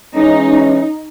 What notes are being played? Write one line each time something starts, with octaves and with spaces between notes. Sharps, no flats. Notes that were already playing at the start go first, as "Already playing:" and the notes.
E3 G#3 C#4 D#4